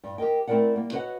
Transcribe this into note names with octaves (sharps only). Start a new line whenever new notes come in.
G2
G4 A#4 D#5 G5
A3 C4 E4 A#4 D5 F#5
G3 A#3
F#4 B4 C#5 D#5 F#5